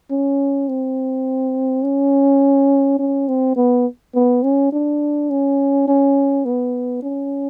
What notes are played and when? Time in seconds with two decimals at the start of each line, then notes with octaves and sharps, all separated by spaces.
0.10 C#4
0.69 C4
1.84 C#4
2.99 C#4
3.28 C4
3.56 B3
4.15 B3
4.43 C#4
4.72 D4
5.30 C#4
5.88 C#4
6.45 B3
7.03 C#4